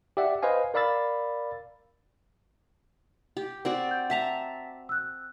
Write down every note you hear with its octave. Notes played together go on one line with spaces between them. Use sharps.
G4 D5 E5 F#5
B4 C5 D#5 F5 G#5
A#4 D5 F5 B5 E6 A6
G4
C4 F#4 D5
G6
E5 F#5 A5 A#5 B6
E6 F#6